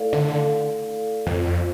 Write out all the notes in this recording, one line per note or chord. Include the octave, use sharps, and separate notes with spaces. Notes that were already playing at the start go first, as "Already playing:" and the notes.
Already playing: A3 E4 A4 D5 F5
D3
F2 B3 F4 C5